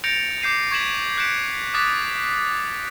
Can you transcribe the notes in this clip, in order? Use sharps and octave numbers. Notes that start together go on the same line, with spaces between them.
G6 A6 A#6 C#7 D7 F7
D6 G6 C7 D#7 F7
C#6 G#6 B6 E7 F#7
F#6 G6 B6 C#7 D7 E7
D6 D#6 F#6 A6 B6